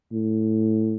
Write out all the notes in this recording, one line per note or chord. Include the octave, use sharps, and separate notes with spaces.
A2